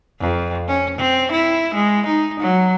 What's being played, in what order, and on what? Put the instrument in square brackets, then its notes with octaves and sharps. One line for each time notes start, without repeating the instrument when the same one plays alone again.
[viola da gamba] F2
C#4
C4
E4
G#3
D#4
F#3